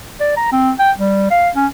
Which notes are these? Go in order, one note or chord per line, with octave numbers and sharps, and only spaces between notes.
D5
A#5
C4
G5
G3
F5
C#4